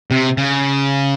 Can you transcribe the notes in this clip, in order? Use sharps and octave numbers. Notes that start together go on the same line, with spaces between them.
C3
C#3